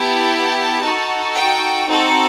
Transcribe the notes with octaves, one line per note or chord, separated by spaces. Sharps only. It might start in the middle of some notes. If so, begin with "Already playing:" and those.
Already playing: B3 E4 G4 A5
D#4 F#4 A4
G5
C4 D#4 F#4 A4